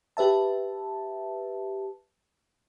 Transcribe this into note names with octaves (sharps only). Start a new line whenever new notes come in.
G4 B4 E5 A5